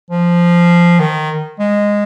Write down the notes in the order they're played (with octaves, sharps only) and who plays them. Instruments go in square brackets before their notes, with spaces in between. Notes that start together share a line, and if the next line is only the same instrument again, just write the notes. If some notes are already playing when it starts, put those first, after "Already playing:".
[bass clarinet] F3
D#3
G#3